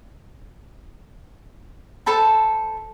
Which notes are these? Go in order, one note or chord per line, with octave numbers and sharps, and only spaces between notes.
A4 C5 A5 B5